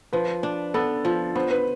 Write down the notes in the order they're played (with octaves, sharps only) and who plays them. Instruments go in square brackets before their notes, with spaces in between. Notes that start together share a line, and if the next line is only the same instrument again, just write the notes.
[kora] F3 [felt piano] B4
[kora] D4
[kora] B3 [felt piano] A4
[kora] F3
[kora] B3 [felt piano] C5
[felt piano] B4